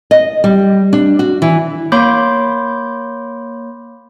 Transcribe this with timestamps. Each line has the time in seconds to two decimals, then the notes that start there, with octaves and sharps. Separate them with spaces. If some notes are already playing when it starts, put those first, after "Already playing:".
0.11 D#5
0.44 G3
0.93 D4
1.19 F#4
1.42 E3
1.92 A#3 C#5 B5 C6 D6 G6